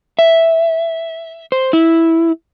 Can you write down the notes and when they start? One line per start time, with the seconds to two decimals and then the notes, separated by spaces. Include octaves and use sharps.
0.19 E5
1.52 C5
1.73 E4